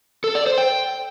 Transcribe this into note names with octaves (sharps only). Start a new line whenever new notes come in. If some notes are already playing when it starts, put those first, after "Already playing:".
A4
D5
C5
G5